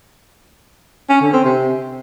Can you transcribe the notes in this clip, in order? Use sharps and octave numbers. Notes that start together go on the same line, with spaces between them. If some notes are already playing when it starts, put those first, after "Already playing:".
C#4
D3
C4
C3